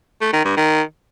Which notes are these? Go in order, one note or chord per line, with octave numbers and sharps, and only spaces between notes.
A3
D#3
G2
D#3